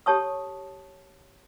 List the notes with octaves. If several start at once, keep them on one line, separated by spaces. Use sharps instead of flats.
G4 A4 C#5 A5 C#6 D#6